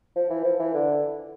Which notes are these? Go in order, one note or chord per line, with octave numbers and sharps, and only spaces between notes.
F3
E3
F3
E3
D3